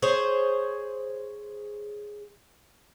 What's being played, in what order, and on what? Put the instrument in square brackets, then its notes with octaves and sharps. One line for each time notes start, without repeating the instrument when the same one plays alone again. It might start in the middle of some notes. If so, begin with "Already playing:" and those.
[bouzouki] G#4 C5 C#5